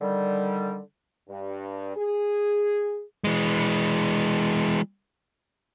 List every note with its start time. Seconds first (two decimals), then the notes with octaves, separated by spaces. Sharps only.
0.01 D3 D#3 G3
1.29 G2
1.96 G#4
3.24 E3 G#3